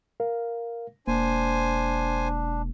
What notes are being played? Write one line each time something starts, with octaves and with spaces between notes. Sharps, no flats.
A#4 F5
E1 A#3 D4 C5 G#5